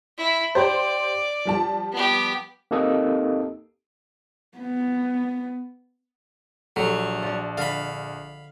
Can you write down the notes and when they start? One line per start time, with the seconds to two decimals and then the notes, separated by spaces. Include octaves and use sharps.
0.18 E4
0.55 G4 C5 D5
1.45 F3 G3 A5
1.92 B3 G4
2.71 A#3 C4 D#4 G4 A4 D#5
4.58 B3
6.76 A#1 F#3 G4 A4
7.22 F3 D4
7.58 D3 D#5 F5 B5